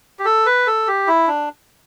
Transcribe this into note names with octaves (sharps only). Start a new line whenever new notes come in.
G4
A4
B4
A4
G4
E4
D4